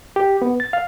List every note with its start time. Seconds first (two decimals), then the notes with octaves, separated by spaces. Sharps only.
0.16 G4
0.42 B3
0.60 A6
0.73 F5